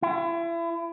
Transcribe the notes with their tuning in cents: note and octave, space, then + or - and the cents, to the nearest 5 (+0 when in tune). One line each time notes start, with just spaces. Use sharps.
E4 +35